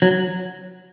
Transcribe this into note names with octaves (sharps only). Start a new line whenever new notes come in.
F#3